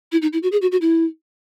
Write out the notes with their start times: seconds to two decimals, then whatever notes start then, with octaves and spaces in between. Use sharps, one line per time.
0.12 E4
0.22 D#4
0.33 E4
0.43 F#4
0.52 G#4
0.62 F#4
0.72 F#4
0.81 E4